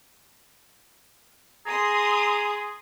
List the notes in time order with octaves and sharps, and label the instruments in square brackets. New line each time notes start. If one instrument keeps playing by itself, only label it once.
[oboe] G#4 [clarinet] A#5 [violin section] C6 D#6